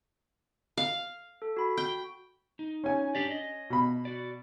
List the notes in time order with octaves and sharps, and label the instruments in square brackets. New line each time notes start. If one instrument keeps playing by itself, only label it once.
[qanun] F5
[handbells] A4
F#4 B5
[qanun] G5
[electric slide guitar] D#4
[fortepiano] C#4 G#5
[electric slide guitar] D4 G4 D5
D#5
[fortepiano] B2 B5
[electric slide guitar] F#4 D5